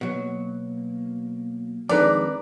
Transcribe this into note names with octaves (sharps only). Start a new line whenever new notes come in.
B2 F#3 A#3
F2 D#3 G#3 C4 D4 B4 D5 A#5